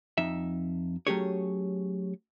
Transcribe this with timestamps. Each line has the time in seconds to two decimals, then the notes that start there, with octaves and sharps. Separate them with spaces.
0.18 F2 D#4 E5
1.07 F#3 A3 C#4 G4 G#4 C#5